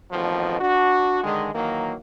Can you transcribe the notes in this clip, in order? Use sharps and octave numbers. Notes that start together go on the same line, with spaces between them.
A1 F2 B2 D#3 F3
D4 F#4
D3 D#3 G#3
D#3 E3 F#3 A#3